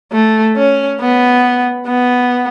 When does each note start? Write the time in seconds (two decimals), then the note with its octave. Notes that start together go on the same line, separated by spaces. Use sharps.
0.12 A3
0.56 C#4
1.00 B3
1.87 B3